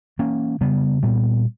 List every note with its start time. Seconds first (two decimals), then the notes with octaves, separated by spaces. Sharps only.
0.19 E3 A#3 C#4
0.61 C#3 G3 B3
1.03 A#2 G3 B3